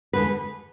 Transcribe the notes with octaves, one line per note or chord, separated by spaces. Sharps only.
E2 D3 G#3 B4